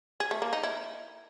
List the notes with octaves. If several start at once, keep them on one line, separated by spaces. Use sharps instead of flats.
G#4
A3
A#3
D#4
E4